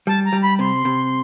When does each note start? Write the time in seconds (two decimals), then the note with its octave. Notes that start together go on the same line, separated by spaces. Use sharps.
0.07 G3 A5
0.25 A#5
0.33 G3
0.42 B5
0.59 C3 C6
0.85 C3